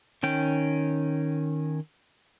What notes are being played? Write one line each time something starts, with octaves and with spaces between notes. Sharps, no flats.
D#3 C#4 G5